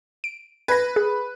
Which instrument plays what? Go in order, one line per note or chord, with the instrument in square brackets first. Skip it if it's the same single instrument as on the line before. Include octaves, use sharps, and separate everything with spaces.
[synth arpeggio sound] D7
[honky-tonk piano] B4 [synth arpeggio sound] G#6 A#6
[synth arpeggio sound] G#4